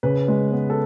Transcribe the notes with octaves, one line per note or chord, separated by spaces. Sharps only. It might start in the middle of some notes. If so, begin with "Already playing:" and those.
C#3 B4
G#3
B3
A4